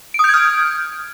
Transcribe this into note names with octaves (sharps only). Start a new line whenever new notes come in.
D#6 F6 G6 G#6 D7